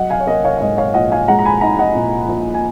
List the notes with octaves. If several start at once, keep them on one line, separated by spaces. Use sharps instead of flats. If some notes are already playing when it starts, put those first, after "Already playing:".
Already playing: F#3 D#5 F#5
F5 G#5
C#5
A#3 D#5
C#5 F5
F5
G#2 D#5
C#5 F5
A#1 D#5 F#5
F5 G#5
G#3 F#5 A#5
A#5
G#5 B5
D#4 F#5 A#5
D#5 F#5
A#2
A#1
G#5